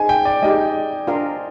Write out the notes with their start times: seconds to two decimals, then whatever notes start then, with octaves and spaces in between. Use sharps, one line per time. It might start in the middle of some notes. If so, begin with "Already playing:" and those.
Already playing: D#4 G#4 C5 D#5 G#5
0.09 G5
0.25 D5
0.42 G#3 D#4 G4 D#5
1.07 D4 F4 A#4 F5